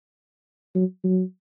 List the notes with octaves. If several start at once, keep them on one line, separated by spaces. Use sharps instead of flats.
F#3
F#3